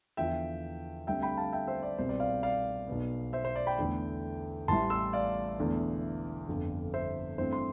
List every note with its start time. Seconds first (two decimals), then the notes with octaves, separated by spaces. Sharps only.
0.17 E2 D3 F3 E5 G5
1.07 D2 D3 G3 C4 E5 G5
1.22 G5 B5
1.37 F5 A5
1.53 E5 G5
1.67 C5 E5
1.83 D5
1.98 C2 B2 G3 C4 C5
2.09 D5
2.20 D5 F5
2.43 D5 F5
2.88 B1 B2 B3
3.33 C5 E5
3.45 C5
3.56 D5
3.67 G5 B5
3.79 E2 D3 A3
4.68 A1 A2 E3 G3 A5 C6
4.90 C6 E6
5.13 D5 F5
5.59 E1 E2 D3 A3
6.48 G1 F2 D3
6.94 C5 E5
7.38 G2 E3 A3 C4 C5
7.53 C6